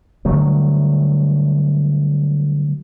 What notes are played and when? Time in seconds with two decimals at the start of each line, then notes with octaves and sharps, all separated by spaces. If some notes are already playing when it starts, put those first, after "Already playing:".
0.25 D3 F#3 G3 A3